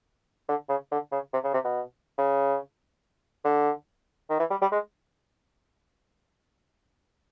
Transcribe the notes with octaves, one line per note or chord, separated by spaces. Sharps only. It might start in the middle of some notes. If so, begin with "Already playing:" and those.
D3
C#3
D3
C#3
C3
C#3
C3
B2
C#3
D3
D#3
E3
G3
G3
G#3